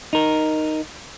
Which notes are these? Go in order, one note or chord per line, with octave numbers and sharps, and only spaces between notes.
D#4 A#4